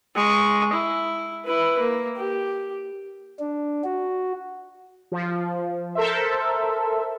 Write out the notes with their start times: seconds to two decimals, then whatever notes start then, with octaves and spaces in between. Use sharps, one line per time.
0.15 G#3 C#6
0.73 E4
1.45 E4 B4
1.80 A#3
2.17 G4
3.40 D4
3.84 F#4
5.12 F3
5.95 A4 A#4 C5 E5